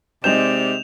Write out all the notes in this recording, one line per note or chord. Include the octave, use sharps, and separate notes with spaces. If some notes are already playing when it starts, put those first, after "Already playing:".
C3 G#3 C4 D#4 D5 G6 E7 F7